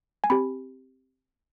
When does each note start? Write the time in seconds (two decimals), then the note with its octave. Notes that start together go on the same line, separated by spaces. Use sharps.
0.24 G#5
0.30 C4 G4 B5